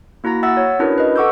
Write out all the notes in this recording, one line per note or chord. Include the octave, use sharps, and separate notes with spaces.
A#3 E4 F#4 A#5 A#6
E5 F#5 E6 A6
C#5
C#4 D4 E4 F#4 A#4 B4
B4 D#5
A4 F#5 C#6 D6 E6 G6